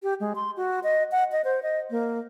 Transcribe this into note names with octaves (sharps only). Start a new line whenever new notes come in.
G4
G#3
C6
F#4
D#5
F#5
D#5
C5
D#5
A#3